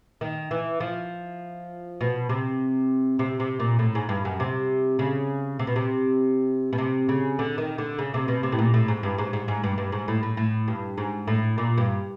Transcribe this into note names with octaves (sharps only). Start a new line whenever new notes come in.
D#3
E3
F3
B2
C3
C3
C3
A#2
A2
G#2
G2
F#2
C3
C#3
C3
B2
C3
B2
C3
C#3
D3
D#3
D3
C#3
C3
B2
C3
A2
A#2
A2
G#2
G2
G#2
G#2
G#2
G2
G2
G#2
A2
A2
A2
G2
G#2
A2
A#2
G2